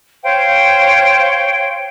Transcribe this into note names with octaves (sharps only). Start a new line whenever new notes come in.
C5 C#5 F5 G5